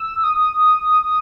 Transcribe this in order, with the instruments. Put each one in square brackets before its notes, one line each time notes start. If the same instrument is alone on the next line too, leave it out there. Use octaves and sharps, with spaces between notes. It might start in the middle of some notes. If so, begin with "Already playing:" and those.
Already playing: [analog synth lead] E6
D#6